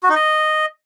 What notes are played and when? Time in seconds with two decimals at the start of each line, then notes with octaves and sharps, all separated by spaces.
0.03 F#4
0.09 D#4
0.15 D#5